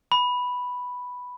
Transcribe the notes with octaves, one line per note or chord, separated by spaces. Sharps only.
B5